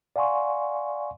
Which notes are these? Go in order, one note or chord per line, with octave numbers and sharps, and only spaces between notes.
D5 F5 F#5 G#5 C6 C#6